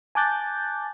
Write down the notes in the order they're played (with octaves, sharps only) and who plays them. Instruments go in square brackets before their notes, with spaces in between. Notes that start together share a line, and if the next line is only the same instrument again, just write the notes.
[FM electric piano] G#5 A5 D6 F#6 G6 A6